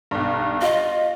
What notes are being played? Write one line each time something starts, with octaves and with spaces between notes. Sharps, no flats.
B1 G2
F4 D#5